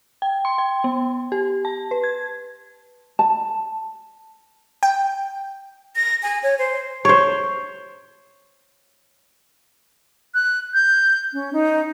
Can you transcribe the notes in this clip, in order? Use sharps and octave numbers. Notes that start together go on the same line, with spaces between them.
G5
C6
G5
B3
G4
A5
B4
G#6
A5
G5
A#6
G#5
C#5
C5
C5 C#5
F#6
G6
C#4
D#4